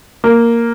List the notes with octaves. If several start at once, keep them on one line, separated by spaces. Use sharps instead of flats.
A#3